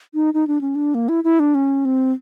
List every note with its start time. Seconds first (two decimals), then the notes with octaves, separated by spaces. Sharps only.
0.14 D#4
0.34 D#4
0.47 D4
0.61 C#4
0.75 D4
0.95 A#3
1.09 E4
1.24 E4
1.40 D4
1.55 C#4
1.85 C4